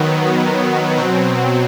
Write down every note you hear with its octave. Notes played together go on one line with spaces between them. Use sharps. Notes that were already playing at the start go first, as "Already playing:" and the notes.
Already playing: D#3 F#3 B3
B2 F#3 C4